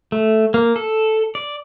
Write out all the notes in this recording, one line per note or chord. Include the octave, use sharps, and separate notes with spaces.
A3
A#3
A4
D5